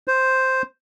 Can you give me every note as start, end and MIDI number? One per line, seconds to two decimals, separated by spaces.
0.08 0.62 72